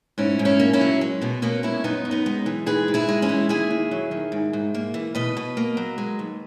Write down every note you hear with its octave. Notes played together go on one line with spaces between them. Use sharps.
G#2 C#4 E4
G#2
C#4 E4
A#3
C#4 E4
F#3
G#3
B2 B3
B2 A#3 C#4
G#3 C#4 E4
F#2 B3 D#4
F#2
B3 D#4
G#3
E3
G#2 G#4 B4
G#2
E4 G#4
G#3
C#4 E4
E3
D#2 E4 G#4
D#2
F#3
D#3
G#2
G#2
A#3
E3
B2 B4 D#5
B2
A#3
F#3
G#3
D#2